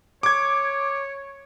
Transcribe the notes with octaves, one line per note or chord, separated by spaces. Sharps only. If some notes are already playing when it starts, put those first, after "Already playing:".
C#5 D6 G#6